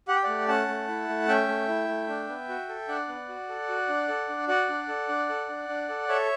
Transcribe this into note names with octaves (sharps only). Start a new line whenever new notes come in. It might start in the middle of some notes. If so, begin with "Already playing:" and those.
G4 F#5
G5
A3 D5 F#5
C#4 F#5 A5
A3
E4
A3
C#4 E5 G5
A3
E4
A3
D4
B3
F#4
A4
D4 D5 F#5
B3
F#4
A4
F#4
D4
A4
D4
F#4 D5 F#5
D4
A4
D4
A4
D4
D4
A4
A4 C#5 E5